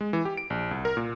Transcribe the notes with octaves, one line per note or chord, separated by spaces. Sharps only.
G#3
E3
G4
D7
A#1
C2
A#4
A#2